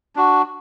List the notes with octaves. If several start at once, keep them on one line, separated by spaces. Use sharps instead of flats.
D4 F#4